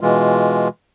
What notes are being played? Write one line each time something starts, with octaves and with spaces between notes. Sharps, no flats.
B2 E3 G#3 F4